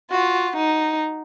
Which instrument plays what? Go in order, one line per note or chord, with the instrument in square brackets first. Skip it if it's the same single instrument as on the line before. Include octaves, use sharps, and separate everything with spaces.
[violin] F4 [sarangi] F#4
[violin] D#4